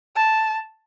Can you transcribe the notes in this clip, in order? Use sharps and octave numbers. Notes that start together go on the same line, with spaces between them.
A5